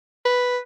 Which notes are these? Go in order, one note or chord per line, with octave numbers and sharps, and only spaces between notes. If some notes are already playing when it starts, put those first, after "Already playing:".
B4